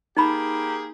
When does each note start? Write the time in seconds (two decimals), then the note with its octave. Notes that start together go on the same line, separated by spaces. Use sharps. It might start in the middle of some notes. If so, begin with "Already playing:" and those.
0.17 A#3 D#4 G4 G#4 B5